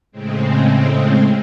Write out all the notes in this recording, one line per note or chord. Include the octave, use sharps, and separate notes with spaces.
A2 C#3 G#3 C4